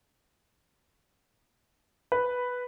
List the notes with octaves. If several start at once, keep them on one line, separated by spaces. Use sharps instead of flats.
B4